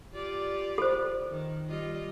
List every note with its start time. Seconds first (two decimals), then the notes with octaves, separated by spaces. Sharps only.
0.13 F4 G4 D5
0.78 A4 C5
1.31 D#3
1.66 G3 F4 D#5